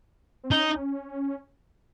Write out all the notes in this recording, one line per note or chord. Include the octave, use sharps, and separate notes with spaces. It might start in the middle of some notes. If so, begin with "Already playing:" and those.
C4
C#4 D#4